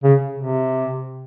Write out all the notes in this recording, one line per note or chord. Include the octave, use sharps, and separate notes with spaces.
C#3
C3